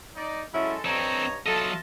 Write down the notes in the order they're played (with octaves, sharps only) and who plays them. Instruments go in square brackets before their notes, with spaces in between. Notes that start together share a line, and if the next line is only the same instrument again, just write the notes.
[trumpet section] D#4 D5
[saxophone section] F#3 C#4 E4 [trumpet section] G#3 A4
[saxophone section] G2 [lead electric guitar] C4 A4 [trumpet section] C#5 D#5 A#5
[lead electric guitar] F#3 D#5 [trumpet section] F4 E5 A5 [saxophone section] A4